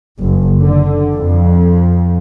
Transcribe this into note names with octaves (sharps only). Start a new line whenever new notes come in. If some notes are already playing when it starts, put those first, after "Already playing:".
F#1
D3
F2